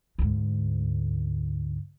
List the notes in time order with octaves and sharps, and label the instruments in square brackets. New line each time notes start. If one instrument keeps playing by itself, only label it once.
[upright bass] D2 G#2